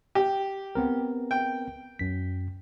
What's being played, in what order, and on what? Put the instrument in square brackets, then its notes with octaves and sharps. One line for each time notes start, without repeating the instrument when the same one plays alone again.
[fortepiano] G4
[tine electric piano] B3 C4 A#4
[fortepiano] G5
[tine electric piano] F#2 B6